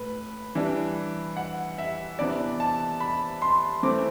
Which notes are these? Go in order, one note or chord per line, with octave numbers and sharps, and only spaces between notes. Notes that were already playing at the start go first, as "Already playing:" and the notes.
Already playing: A2 B4
E3 G3 D4
F#5
E5
C3 E3 B3 D4 D5
A5
B5
C6
E3 A3 C4 D6